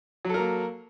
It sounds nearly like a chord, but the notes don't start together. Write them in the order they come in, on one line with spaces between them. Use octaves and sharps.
F#3 A4 A#4 A#3